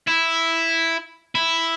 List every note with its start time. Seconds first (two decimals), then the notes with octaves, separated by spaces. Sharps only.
0.08 E4
1.35 E4